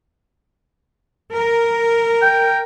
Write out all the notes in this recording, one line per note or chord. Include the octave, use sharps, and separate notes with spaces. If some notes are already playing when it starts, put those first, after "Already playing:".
A#4
G5